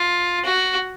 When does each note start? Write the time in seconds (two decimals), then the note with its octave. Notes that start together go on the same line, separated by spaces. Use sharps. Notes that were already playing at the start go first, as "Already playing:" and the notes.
Already playing: F4
0.45 F#4